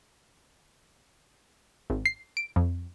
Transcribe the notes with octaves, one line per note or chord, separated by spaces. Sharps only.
G#1
C7
D7
F2